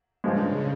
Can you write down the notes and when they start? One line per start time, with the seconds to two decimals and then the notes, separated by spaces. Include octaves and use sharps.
0.24 G2 C#3 F3 G#3